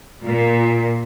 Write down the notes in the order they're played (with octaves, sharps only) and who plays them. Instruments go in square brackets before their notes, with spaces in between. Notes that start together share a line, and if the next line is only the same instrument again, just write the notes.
[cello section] A#2